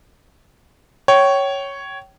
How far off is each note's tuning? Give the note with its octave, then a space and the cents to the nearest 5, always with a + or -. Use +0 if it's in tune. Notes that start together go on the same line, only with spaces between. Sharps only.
C#5 +0 G5 -30